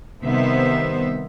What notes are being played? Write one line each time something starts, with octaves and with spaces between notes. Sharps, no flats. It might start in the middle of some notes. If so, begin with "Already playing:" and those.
C3 D#3 G3 B3 C5 E5